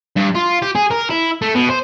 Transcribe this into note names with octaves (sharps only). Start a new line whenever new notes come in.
G2
F4
G4
G#4
A#4
E4
A3
B2
C5